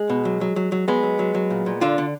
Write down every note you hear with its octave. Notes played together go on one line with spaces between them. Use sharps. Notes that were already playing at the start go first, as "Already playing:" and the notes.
Already playing: G#3
B2
F#3
F#3
F#3
F#3
F#3 G#3 B3
F#3
F#3
F#3
A#2
A#2
D3 D4 F4
D3